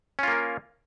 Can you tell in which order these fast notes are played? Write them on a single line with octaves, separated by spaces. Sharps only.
C#4 F4 A#3 A#4